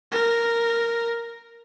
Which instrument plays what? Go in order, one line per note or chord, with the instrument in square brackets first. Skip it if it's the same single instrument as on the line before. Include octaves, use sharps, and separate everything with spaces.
[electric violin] A#4